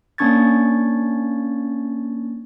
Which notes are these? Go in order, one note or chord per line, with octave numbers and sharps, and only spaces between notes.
A#3 C#4 D4 C#6 G#6 A6